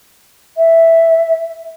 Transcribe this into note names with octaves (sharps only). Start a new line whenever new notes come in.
E5